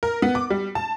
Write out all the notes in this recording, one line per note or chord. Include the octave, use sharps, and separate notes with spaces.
A#4
B3
D6
G3
A5